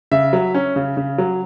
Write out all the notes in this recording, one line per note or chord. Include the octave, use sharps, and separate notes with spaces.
C#3 E5
F#3
C#4
C#3
C#3
F#3